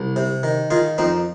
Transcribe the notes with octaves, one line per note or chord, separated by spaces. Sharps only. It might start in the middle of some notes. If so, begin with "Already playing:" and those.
Already playing: C2
C3
D#3
D#3 F4 G#4
F2 C4 D#4